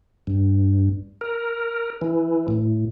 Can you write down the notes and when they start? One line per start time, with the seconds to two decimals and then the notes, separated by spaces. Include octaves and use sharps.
0.27 G2
1.21 A#4
2.01 E3
2.48 A2